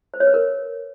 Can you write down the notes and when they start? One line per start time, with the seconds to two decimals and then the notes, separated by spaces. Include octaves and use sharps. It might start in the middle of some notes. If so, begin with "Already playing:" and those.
0.14 C5
0.20 C#5
0.27 B4
0.34 A#4